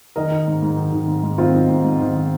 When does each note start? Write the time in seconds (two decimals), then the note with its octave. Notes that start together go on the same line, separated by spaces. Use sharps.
0.16 D#3 A#4 D#5
0.32 D#3
0.47 G#2
0.63 G#2
0.77 D#3
0.92 D#3
1.08 G#2
1.23 G#2
1.38 D#3 C4 F4
1.54 D#3
1.69 G#2
1.85 G#2
2.00 D#3
2.15 D#3